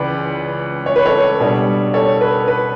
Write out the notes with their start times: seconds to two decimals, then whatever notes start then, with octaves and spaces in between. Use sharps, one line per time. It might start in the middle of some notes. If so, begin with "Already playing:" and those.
Already playing: C#2 C#3 E3 B4 D5
0.86 C#5
0.96 B4
1.05 A4 C#5
1.40 B2 G3 D4
1.94 A4 C#5
2.21 B4
2.48 B4